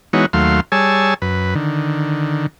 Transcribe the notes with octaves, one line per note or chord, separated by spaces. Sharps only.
E3 G#3 B3 D#4 F#4 C#5
D#2 F#3 A3 F5 C6
G3 G#4 C#5 G#5 A5 E6
F#2 B4
D3 D#3